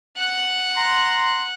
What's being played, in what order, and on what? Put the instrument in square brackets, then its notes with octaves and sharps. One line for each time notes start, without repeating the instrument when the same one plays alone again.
[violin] F#5 F#6
[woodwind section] A#5 C6